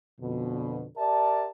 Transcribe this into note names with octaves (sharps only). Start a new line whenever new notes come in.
F2 B2 D3
G4 A#4 D5 E5 A5